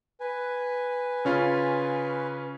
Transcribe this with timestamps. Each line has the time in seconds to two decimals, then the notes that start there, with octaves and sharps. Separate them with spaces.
0.20 B4 G#5
1.25 C#3 C#4 F4